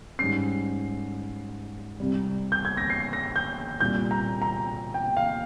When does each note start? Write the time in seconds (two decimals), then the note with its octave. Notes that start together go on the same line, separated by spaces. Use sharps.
0.19 G#2 G3 C#4 C7
2.00 C2 C3 G3
2.52 G6
2.65 G#6
2.77 A#6
2.90 C7
3.13 A#6
3.36 G6
3.81 C2 A#2 G3 G6
4.11 A#5
4.42 A#5
4.94 G5
5.17 F5